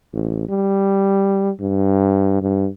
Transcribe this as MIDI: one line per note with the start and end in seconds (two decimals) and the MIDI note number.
0.13 0.47 33
0.49 1.50 55
1.60 2.42 43
2.42 2.68 43